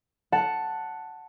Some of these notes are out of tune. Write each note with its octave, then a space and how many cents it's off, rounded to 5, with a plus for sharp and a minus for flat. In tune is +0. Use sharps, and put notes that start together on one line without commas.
F#5 +0 A5 +5